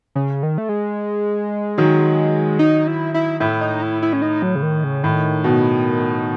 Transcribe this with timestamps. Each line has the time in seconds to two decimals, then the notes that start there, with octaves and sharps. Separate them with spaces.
0.15 C#3
0.43 D#3
0.58 A3
0.69 G#3
1.78 D#3 F#3
2.59 D#4
2.87 E4
3.14 E4
3.40 A2 E4
3.61 D#4
3.82 E4
4.02 E4
4.13 C#4
4.22 D#4
4.42 F#3
4.55 C#3
4.63 D#3
4.84 C#3
5.03 A2 D#3
5.44 B2